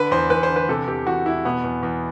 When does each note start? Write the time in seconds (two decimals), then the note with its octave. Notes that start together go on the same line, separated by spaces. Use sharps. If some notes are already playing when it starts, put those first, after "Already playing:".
Already playing: D3 B4
0.11 E2 C5
0.30 E2 B4
0.43 C5
0.49 D3
0.56 B4
0.69 C3 A4
0.88 E2 G4
1.06 E3 F#4
1.25 E2 E4
1.45 B2 B3
1.64 E2
1.83 E2